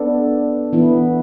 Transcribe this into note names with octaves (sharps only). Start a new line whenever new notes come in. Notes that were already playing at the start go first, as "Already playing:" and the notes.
Already playing: B3 D4 A4
E3 B3 E4